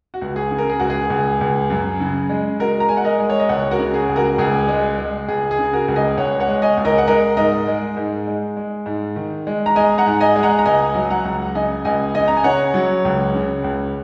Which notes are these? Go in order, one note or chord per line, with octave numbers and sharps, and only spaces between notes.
F#4
C#2
G#4
C#3
A#4
G#4
C#2 F#4
G#4
C#2
C#2
F#2
C#3
G#3
G#3 F#4 A#4
A#5
G#3 G#5
F#5
A#4 D#5
G#3
C#5
D#5
C#2 C#5 F#5
F#4 A#4
C#3
G#4
C#2
F#4 A#4
C#2 G#4
G#3
G#3
C#2 G#4
G#4
C#3
F#4 A#4
C#2
D#5 G#5
C#2 C#5 F#5
C#5 F#5
G#3
D#5 G#5
C#2
A#4 D#5
F#5
G#3 A#4 D#5
G#2 A#4 D#5
G#3
G#2
G#3
G#3
G#2
D#3
G#3
A#5
G#3 D#5 G#5
F#5 A#5
G#2
D#5 G#5
G#3
F#5 A#5
A#5
C#2 D#5 G#5
F#3
F#5 A#5
C#2
C#3 D#5 G#5
C#2 D#5 G#5
C#3 D#5 G#5
A#5
G#5
C#3 C#5 F#5
F#3
C#2
C#3
C#2